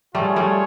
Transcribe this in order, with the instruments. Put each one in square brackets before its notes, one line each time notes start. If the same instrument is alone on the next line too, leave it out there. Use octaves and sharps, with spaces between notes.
[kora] G3 A3 [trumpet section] F4 G#4 C#5
[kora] G3 A3